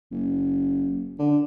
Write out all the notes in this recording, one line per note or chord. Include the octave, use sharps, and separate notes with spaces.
F#1
D3